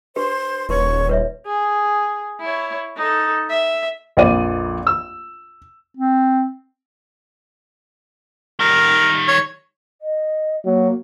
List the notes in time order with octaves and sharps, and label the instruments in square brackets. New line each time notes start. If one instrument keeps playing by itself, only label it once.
[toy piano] D4 G4 B4 [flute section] C5 C6
[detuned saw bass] D#1 [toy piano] E4 B4 C6 [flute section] C#5 C#6
[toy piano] B4 C#5 E5
[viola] G#4
E4 C#5
D#4 A4
E5
[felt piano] A#1 F2 D5 D#7
E6
[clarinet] C4
[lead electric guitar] D#3 G3 [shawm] A#4
[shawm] C#5
[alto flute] D#5
[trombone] F#3 [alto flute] A#3